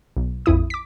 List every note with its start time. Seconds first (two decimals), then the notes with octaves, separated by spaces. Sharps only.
0.17 B1
0.46 A#1 F2 E4 D#6
0.70 D6 B6